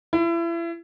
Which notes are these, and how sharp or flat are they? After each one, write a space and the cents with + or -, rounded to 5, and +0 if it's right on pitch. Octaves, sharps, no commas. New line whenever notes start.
E4 +35